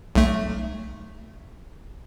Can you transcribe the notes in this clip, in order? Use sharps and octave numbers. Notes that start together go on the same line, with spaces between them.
B1 A3